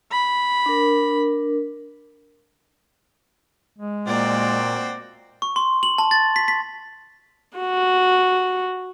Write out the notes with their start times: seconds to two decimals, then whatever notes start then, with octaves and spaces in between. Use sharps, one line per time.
0.11 B5
0.66 D4 A#4
3.79 G#3
4.07 A#2 A#3 C4 F#4 D5
5.42 C#6
5.56 C6
5.83 F#7
5.98 A5
6.11 A6
6.36 B6
6.48 B6
7.58 F#4